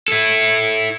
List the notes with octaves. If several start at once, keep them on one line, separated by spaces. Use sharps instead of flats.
E4 A4